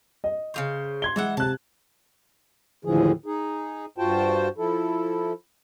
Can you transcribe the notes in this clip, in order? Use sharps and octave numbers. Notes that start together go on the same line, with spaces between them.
D#5
C#3 F#3 C5
C6 G#6 G7
E3 G#3 E5 F#5
C3 A5 F#6
D#2 A2 D3 E3 F3 G#4
D#4 G#4
G2 F4 F#4 C5 G5 A5
F3 E4 A4